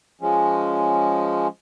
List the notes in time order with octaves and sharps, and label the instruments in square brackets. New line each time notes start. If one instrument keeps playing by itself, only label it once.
[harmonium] F3 G#3 C#4